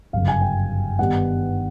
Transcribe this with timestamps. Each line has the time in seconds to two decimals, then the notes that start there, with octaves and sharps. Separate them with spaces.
0.13 G1 F#2 C#3 F5
0.28 G#5
0.42 G5
0.99 G2 D#3 G3 B3 D#4 F#5